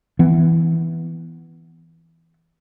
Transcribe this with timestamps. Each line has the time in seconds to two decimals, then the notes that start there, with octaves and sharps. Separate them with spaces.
0.19 E3 B3